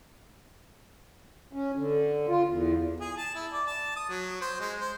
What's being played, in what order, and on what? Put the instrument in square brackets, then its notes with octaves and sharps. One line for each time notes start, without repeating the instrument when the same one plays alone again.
[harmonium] C#4
D3
F4
E2
[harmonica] G#4
A5
E4
D5
A5
D#6
F#3
C5
G#3
C5